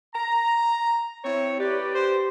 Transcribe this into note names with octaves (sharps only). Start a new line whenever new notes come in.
A#5
C4 E4 C#5
G4 B4 D5
C5